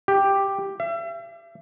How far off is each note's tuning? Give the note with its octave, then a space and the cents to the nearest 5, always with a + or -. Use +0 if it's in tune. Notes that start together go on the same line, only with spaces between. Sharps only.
G4 +5
E5 +40